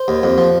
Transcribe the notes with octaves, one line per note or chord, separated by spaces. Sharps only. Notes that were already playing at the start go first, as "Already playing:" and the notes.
Already playing: C5
D#2
F2
F3